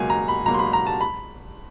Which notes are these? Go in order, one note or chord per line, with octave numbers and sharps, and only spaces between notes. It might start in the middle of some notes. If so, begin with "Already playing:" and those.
Already playing: C#2 B2 F#3 A#3 G#5
A#5
B5
C#2 B2 F#3 A#3 A#5
C6
B5
A#5
A5
B5